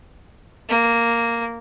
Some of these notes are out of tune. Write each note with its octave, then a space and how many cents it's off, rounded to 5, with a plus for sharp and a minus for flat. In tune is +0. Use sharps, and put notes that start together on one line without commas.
A#3 -5